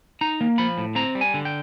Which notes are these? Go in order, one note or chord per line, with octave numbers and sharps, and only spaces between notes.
D#4 A#5
A#3
F3 B5
A2
C4 A#5
G3
G#5
D3
G5